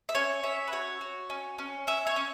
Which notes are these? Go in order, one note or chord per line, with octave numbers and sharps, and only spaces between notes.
E5
C#4 C#5
C#4 E5
B4
F#4 C#5
F#4
C#4
C#4
C#4 E5
C#5
C#4